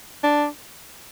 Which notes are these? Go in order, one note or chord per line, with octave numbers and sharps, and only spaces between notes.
D4